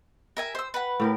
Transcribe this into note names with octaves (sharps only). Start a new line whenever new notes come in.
A#4 E5 G#5
C5 E6
B4 F#5
A2 G4 A#4